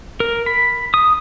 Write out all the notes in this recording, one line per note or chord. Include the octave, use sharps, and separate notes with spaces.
A#4
B5
D#6